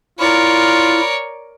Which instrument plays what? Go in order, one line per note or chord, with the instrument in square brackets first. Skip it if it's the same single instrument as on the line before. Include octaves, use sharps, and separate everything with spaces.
[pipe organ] E4 [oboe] F4 [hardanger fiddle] A#4 D5 [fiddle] C#5